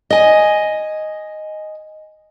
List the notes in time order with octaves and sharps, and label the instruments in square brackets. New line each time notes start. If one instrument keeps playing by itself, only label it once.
[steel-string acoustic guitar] D#5 G#5